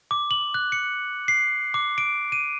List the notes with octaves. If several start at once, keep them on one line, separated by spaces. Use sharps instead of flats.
D6
F#7
F#6
C#7
C7
D6
D7
D#7